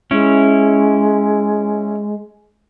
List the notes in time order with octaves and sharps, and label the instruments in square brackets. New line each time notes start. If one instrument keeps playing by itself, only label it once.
[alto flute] G#3 [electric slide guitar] C#4 E4